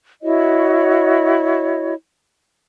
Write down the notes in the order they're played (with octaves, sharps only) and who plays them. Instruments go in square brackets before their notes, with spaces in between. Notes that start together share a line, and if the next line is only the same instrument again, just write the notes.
[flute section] E4 F#4 C#5 D#5